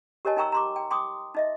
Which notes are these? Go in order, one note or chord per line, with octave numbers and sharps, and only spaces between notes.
G4 A#4 C#5 D#5 G#5 A5
D#4 A#4 G5 A#5 C#6 E6
A#5 C6 D6
G5
G5 C6 D6 D#6
D#4 D#5 E5